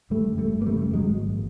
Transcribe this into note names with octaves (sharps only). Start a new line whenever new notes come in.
D3 G3 A3
F#2
G3 A3
G1
A#3
C#3 G3 A3
F#2
F#3 G#3
G#1
A#1